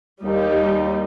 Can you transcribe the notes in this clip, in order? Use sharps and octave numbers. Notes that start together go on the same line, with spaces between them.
D#2 G3 D#4